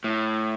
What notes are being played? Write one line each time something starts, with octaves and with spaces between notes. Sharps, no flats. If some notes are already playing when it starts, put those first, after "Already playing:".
A2